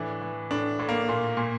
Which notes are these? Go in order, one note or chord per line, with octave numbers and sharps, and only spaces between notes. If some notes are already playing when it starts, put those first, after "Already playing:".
Already playing: A2 E3 D4
E3
A2 D4
A2
A#3
A#2
A#2